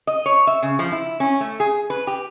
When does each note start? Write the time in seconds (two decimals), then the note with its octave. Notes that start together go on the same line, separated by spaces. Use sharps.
0.07 D#5
0.26 C#5
0.47 E5
0.63 C#3
0.79 F3
0.92 E4
1.20 C#4
1.41 A3
1.60 G#4
1.90 B4
2.07 G4